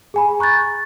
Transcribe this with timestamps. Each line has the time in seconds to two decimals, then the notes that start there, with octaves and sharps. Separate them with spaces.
0.14 G#4 G#5 B5
0.39 A#5 C#6 F#6 G6 A6